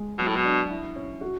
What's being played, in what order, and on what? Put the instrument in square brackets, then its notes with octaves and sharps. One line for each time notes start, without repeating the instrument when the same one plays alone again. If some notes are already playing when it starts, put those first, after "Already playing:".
Already playing: [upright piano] G#3
[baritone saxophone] B2 [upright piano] F#3
[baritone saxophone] A2
B2
[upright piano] D4
E4
C#4
F#4